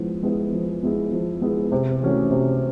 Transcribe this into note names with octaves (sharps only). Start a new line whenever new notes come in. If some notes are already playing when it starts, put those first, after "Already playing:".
Already playing: F3 G#3 B3 E4
G#3 B3 E4 G#4
F3
G#3 B3 E4 G#4
F3
G#3 B3 E4 G#4
C3
E3 A3 C#4 F#4
C3